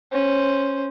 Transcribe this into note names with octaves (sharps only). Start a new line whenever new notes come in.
C#4 C5